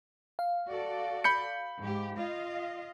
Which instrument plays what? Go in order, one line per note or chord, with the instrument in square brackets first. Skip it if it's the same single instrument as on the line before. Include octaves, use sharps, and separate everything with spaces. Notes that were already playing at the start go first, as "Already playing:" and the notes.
[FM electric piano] F5
[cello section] F#4 A4 D5
[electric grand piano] B5 G6 C#7
[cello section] G#2 G4
F4 D#5 F5